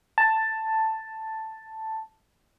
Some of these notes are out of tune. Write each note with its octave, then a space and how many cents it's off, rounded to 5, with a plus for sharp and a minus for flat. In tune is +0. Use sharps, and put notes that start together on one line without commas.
A5 +5